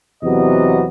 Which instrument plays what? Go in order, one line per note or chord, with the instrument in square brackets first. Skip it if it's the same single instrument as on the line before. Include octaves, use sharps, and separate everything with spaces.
[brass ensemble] E2 C3 F#3 B3 D#5